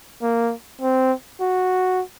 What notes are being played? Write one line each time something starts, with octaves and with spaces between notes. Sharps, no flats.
A#3
C4
F#4